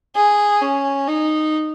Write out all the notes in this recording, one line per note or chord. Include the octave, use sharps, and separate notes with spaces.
G#4
C#4
D#4